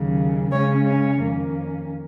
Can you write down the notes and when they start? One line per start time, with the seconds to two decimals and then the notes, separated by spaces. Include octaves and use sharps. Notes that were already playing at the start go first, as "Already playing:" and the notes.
Already playing: D#2 C#3 F#3
0.50 C#3 G#3 C#4 C#5
0.85 C#5
1.20 F2 D#3 A#3 C#4